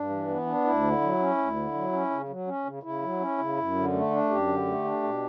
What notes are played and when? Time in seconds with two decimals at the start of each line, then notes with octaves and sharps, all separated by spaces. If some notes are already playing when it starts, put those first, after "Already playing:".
Already playing: G2 D4
0.09 E3
0.28 B3
0.46 D4
0.65 D2 E4
0.83 D3
1.02 F#3
1.19 C#4
1.37 D2
1.56 D3
1.74 F#3
1.92 C#4
2.11 C#3
2.29 F#3
2.47 C#4
2.65 C#3
2.83 C#3 E4
3.02 F#3
3.20 C#4
3.38 C#3
3.56 F#2
3.75 D3
3.93 A3
4.11 D4
4.29 F#2 G4
4.47 D3
4.66 A3
4.84 D4
5.03 B2